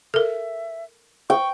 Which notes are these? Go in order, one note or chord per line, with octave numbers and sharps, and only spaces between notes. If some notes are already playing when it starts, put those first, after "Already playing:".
A4 A#4 E5
G5 C#6